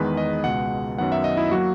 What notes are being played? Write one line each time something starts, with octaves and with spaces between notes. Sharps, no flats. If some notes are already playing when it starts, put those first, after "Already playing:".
Already playing: E2 D#3 G#3 B3 B4
D#5
C#2 B2 G#3 F#5
F#2 D#3 F#3 B3 F#5
E5
D#5
E4
F#3 A#3 F#4